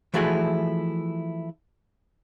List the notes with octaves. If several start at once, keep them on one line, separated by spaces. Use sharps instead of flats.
E3 F3 A3 E4 F#4 G#4